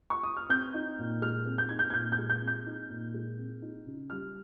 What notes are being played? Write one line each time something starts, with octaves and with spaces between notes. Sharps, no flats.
C#6
D#6
F6
C4 G6
D#4
A#2
G#3 F6
C4
G6
D#4 G#6
G6
G#6
A#2 G6
G6
G#3
G6
C4
G6
D#4
A#2
G#3
C4
D#4
C#3
G3 F6